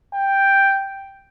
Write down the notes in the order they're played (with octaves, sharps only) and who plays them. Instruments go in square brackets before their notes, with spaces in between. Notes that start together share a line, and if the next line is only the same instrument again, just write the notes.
[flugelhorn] G5